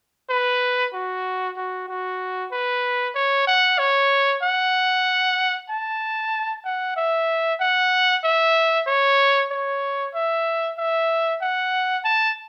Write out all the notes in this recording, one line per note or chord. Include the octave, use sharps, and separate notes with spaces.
B4
F#4
F#4
F#4
B4
C#5
F#5
C#5
F#5
A5
F#5
E5
F#5
E5
C#5
C#5
E5
E5
F#5
A5